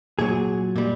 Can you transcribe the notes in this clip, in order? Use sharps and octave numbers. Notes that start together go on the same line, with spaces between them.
A#2 F#3 G#4
A#2 G3